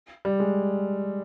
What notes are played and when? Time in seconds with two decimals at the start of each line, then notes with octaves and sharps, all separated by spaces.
0.25 G3
0.40 G#3